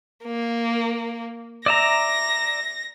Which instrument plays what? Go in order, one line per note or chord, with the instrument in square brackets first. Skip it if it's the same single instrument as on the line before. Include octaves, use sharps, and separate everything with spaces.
[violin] A#3
[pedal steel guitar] D5 E5 A#5 [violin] A#6